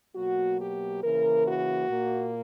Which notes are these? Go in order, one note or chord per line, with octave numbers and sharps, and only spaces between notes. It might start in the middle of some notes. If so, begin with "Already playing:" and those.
B2 F#3 A#3 F#4
G4
C#3 E3 A#3 A#4
F#4
A#2 A#3